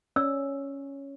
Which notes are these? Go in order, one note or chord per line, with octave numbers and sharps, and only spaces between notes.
C#4 D5 E6